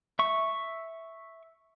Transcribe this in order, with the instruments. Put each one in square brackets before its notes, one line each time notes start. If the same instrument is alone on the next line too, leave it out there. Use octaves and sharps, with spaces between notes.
[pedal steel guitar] E5 C#6